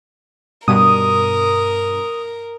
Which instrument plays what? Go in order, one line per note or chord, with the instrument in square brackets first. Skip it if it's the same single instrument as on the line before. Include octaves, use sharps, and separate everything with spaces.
[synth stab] G2 B2 [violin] A#4 [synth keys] D#6 D#7